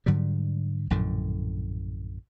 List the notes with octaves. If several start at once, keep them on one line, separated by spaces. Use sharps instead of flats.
G#2 D3 F#3 G3
A#1 F#2 A2 D3